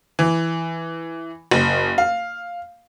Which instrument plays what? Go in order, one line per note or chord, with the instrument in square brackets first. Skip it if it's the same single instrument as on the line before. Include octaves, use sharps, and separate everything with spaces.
[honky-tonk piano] E3
F#1
F5